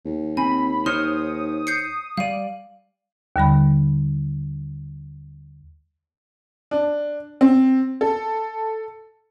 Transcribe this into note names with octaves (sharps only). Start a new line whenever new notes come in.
D#2
C4 G#5 B5
D#4 C5 C#5 C6 D#6 F6
G6 C7 C#7
G3 D5 F5 D#7
D#2 D3 G3 B5
D4
C4
A4